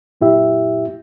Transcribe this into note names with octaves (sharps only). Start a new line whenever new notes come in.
F#2 A#2 E4 G4 E5